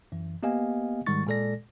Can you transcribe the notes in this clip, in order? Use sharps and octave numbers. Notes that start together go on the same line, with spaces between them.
F#2 E3
A#3 B3 G4 D#5 F5 G#5
G#2 D#3 G3 G#3 C#6 A6
A#2 G#3 A4 D5 A#6